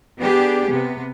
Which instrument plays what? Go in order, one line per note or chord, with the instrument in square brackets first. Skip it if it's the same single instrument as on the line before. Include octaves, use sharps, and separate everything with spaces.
[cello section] B3 D4 G4 G#4
C3 B3